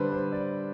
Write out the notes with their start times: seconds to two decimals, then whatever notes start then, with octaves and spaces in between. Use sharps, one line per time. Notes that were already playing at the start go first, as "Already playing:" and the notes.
Already playing: D3 G3 D4 B4 C5
0.12 C5
0.32 D5